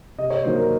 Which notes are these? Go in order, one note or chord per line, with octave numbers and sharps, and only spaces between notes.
C3 D#5
C#5
D#3 F#3 A#3 C5
A#4